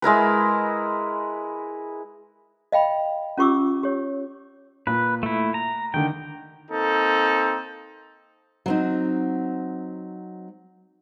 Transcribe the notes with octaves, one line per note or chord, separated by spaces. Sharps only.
G#3 E4 A#4 B4
D#5 F5 G5 B5
C#4 F4 G4 C#6 D6 E6
G4 C#5
A#2 B4
A3 E4
A#5
D3 D#3 G5
A#3 C4 D#4 A4
F#3 C4 D#4